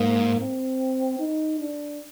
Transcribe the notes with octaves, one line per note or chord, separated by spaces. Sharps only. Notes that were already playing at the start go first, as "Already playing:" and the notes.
Already playing: G#2 A#3
C4
D#4
D4